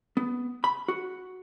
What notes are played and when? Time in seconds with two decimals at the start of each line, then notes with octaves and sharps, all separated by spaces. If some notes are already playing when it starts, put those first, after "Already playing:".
0.17 B3
0.64 B5
0.88 F#4